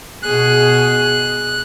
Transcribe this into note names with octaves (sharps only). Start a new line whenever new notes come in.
B2 G#4 F#6